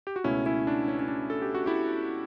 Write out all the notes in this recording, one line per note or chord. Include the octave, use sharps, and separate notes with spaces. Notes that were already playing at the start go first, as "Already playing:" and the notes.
G4
F#4
C#2 B2 A3 C#4 E4
C#4 E4
D4
C#4
C#4
D4
A4
G4
F#4
E4 G4